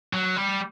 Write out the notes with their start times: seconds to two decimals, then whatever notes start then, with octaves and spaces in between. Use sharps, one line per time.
0.13 F#3
0.36 G3